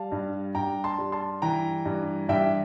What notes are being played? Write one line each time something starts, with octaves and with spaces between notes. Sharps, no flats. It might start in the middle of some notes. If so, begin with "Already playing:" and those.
Already playing: G3 F5 A5
G2
G2 G5 A#5
A5 C6
G3
A5 C6
E3 G5 A#5
G2
G2 E5 G5